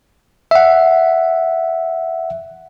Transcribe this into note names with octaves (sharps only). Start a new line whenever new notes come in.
E5 F#5